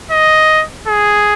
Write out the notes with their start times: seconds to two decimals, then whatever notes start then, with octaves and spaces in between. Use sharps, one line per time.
0.11 D#5
0.87 G#4